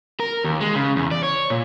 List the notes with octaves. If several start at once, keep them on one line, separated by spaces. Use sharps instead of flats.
A#4
D#2
G#3
C#3
E2
D5
C#5
A#2